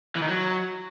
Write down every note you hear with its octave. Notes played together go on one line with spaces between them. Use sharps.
E3
D#3
F#3